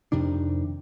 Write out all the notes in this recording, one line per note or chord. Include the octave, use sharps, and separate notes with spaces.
F2 C3 D#3 D4